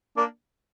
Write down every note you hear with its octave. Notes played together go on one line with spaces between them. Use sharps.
A#3 D4